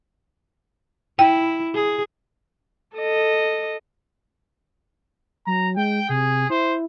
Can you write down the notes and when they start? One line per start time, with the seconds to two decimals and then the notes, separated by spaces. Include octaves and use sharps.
1.19 E4 G5
1.75 G#4
2.96 A4 D#5
5.47 F#3 A#5
5.77 G#3 G5
6.09 C3 G#4
6.50 E4 C5